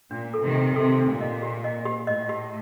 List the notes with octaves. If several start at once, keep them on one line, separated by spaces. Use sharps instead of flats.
A#2 D4
A4
C3 D#3
D4
C3 A4
D4
A#2
D#5
G4
D#5
G4
A2 D#5
G4